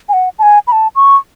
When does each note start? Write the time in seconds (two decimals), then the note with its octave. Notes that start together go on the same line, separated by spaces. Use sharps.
0.09 G#5
0.13 F#5
0.39 A5
0.43 G#5
0.67 B5
0.72 A5
0.96 C#6